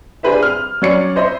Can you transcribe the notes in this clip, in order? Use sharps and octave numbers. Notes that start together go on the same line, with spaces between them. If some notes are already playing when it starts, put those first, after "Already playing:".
D4 G4 G#4 B4 C5 E5
F6
F#3 C#4 C#5 D5 C#7
C5 D#5 E5 C6